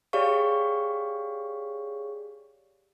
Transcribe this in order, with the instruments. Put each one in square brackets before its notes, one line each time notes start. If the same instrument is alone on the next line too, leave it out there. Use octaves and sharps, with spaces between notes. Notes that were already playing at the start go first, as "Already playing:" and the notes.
[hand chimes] G4 G#4 C#5 D5 F5 C#6